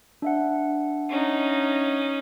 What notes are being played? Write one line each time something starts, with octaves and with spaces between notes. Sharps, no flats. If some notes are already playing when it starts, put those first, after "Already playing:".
D4 E5 F#5
C#4 D#4